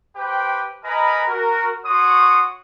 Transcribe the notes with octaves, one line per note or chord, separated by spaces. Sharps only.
G4 B4 C5 G5
A#4 B4 D#5 G#5 A#5 B5
F#4 A#4
F#4 C#5 C6 C#6 D#6